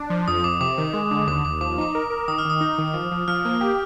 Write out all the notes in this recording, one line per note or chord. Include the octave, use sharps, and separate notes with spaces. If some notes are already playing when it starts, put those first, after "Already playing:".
Already playing: D4
F3
F2 D#6
F2 D6
C3 D6
D#3
G#3
D3
D#2 D6
D#2 D6
F3 D6
D#4 D6
A#4
A#4
D#3 D#6
F6
D#3
D#6
D#4
D#3
F3
F3
F3 F6
A#3
G4